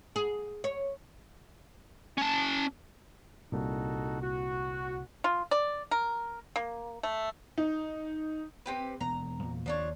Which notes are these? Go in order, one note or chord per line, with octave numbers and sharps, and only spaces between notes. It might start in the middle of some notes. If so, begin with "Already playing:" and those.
G#4
C#5
C#4 A5
C2 A#2 D#4 F#4 A4
F#4
F4
D5
A#4
A#3
A3
D#4
C4 G4 B4
E1 D#2 B3 A#5
E2 A#2
D#2 F3 D4 C#5